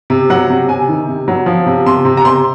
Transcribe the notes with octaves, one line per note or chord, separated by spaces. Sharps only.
C3
F#3 F#5
C3
C3 G#5
D#3
C3
F#3
F3
C3
C3 C6
C3
A#5
C3 C6